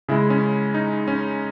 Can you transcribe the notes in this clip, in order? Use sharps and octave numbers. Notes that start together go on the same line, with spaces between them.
C#3 G#3 E4
C#4
D#4
C#4